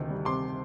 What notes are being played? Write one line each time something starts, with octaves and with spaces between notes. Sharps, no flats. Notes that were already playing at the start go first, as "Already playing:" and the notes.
Already playing: D2 C3 D#3
G3
C3 C6 D6